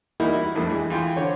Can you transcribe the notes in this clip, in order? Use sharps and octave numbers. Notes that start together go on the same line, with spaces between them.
E3 G3 A#3 D#4 E4 F#4
E4
A#1 F2 G3 A3
E3 G#3
E3 F4 G5 C6
D3 C5 C#5